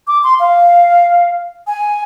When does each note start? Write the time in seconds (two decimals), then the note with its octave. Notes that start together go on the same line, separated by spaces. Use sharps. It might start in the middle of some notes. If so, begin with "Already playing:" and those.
0.07 D6
0.24 C6
0.40 F5
1.67 G#5